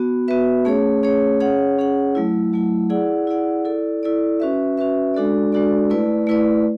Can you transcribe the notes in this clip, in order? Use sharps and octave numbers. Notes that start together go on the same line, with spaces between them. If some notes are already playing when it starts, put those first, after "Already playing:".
Already playing: B3 F#4
B3 F#4 B4 E5
A3 C#4 G#4 C#5
A3 C#4 G#4 C#5
C#4 G#4 C#5 F#5
C#4 G#4 C#5 F#5
F#3 A3 E4
F#3 A3 E4
E4 G#4 D5 F#5
E4 G#4 D5 F#5
E4 A4 D5
E4 A4 D5
C#4 F#4 B4 E5
C#4 F#4 B4 E5
G#3 D4 F#4 A4 D5
G#3 D4 F#4 A4 D5
A3 E4 B4 D5
A3 E4 B4 D5